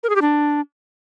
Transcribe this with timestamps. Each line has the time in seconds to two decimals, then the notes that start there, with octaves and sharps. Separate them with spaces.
0.03 A#4
0.09 G#4
0.16 G4
0.22 D4